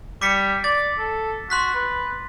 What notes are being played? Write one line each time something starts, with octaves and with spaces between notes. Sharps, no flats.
G3 D6 B6 C#7
D5 A6
A4
F#4 C6 F#6 B6
B4